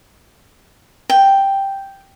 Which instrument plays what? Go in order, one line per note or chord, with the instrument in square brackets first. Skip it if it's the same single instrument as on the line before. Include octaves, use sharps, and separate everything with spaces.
[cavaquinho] G5